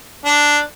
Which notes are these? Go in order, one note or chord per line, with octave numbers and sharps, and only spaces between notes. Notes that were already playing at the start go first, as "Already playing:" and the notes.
D4